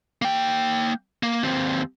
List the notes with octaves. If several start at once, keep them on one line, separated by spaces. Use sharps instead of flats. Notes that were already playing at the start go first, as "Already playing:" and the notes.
A#3 G5
A#3
D#2 C4